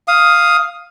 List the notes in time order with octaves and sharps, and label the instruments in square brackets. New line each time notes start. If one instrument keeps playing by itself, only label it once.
[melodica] F5 D#6